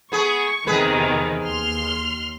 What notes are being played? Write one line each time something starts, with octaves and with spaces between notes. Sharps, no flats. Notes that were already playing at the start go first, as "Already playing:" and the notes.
B3 G#4 C#6
E2 C3 D#3 G#4 B4
D#2 C6 F6